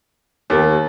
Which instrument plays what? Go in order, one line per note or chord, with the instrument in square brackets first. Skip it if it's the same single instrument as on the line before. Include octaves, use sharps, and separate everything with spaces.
[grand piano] D#2 [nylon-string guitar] B3 G4 A#4